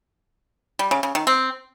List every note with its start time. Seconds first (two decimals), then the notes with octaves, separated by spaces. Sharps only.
0.79 G3
0.91 C#3
1.03 C#3
1.15 D#3
1.27 C4